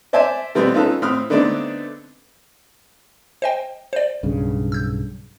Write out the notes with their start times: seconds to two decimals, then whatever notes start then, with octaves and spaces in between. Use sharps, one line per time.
0.13 C5 D5 E5 G#5 A5
0.55 B2 E3 G3 A3 B3 C4
0.74 C#4 D#4 F4 A4 B4
1.02 A2 C4 B5 D#6 F6
1.30 D3 A3 B3 C4 D4 D#4
3.42 C5 D#5 G5
3.93 C5 D5
4.23 B1 G2 C#3
4.72 E6 G6